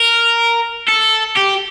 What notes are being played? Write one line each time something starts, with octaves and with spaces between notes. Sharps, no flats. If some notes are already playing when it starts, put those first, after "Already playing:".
Already playing: A#4
A4
G4